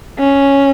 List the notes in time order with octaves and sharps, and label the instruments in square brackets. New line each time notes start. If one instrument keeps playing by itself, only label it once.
[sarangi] C#4